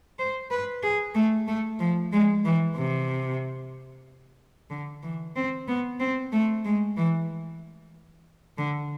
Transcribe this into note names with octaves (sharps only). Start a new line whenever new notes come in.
C5
B4
G#4
A3
A3
F3
G#3
E3
C3
D3
E3
C4
B3
C4
A3
G#3
E3
D3